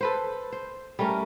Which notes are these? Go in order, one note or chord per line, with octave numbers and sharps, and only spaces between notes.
A4 B4 C5
C5
G3 A3 C#4 A#4